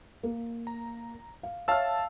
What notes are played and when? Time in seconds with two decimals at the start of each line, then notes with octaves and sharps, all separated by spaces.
0.23 A#3
0.67 A#5
1.43 F5
1.68 C#5 E5 F5 A5 E6 F6